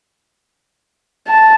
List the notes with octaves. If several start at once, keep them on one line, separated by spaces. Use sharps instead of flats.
A5